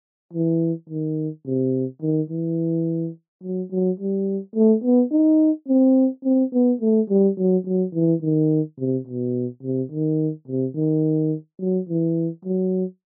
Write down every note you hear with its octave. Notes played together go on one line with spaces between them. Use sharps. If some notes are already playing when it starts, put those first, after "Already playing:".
E3
D#3
C3
D#3
E3
F#3
F#3
G3
A3
B3
D#4
C4
C4
B3
A3
G3
F#3
F#3
E3
D#3
C3
B2
C3
D#3
C3
D#3
F#3
E3
F#3